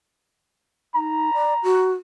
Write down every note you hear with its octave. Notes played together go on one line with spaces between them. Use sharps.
D#4 A#5
D5
F#4